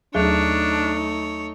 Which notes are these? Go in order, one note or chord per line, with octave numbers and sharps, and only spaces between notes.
D#2 F#3 A3 D4 D#4 G#4 C#5